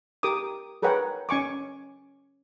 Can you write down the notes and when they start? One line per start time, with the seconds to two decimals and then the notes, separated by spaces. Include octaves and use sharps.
0.23 G4 A#4 D6 D#6
0.82 G#4 A#4 B4 C#5 F#5 G5
1.29 C#4 G#5 C#6 D6